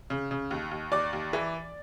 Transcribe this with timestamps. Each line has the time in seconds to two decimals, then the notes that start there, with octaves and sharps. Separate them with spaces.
0.10 C#3
0.31 C#3
0.51 D#2
0.71 D#2
0.92 D#2 D5 D6
1.13 D#2
1.33 E3